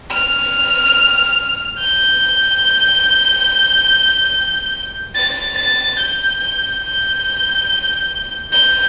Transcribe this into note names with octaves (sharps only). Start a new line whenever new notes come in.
F6
G6
A6
A6
G6
G6
G6